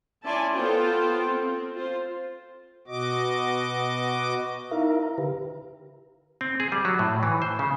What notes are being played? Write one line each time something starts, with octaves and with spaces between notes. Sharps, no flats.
C#4 E4 D5 G#5 A5 C6
B3 F4 A4 C5 G5
C4
F4 C5
B2 F#4 D#5 D6
D#4 E4 A#4 E5 F5 A#5
A#5
D3 G4 B4
C4
G#4
G3
F#3
A2
E3
C5
C#3